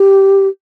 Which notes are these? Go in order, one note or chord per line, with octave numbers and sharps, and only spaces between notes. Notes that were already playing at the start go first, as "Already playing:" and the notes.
Already playing: G4